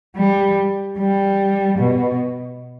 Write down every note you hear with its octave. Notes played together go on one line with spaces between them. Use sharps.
G3
G3
B2